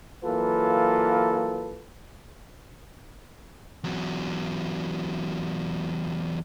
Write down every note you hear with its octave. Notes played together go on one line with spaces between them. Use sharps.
E3 F#3 A#3 F4 A4 B4
E2 F#3